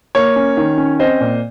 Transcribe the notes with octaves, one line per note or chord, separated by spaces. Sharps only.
A#3 C#5
C#4
D#3
C#4
C4 C5 D#5
A#2